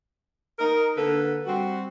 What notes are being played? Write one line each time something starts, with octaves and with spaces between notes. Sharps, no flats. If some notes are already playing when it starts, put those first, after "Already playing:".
D#4 A#4
D3 A#3 A4 B4
G3 C4 F#4